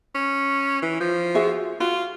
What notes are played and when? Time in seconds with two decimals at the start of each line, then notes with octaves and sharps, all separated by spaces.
0.15 C#4
0.82 E3
1.00 F3
1.35 F#4 G#4 E5
1.80 F4 F#4